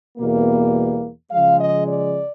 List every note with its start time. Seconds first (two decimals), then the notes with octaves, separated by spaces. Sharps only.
0.18 E2 B2 G3 A#3
1.30 C#3 F3 G#3 F5
1.58 D#5
1.87 D5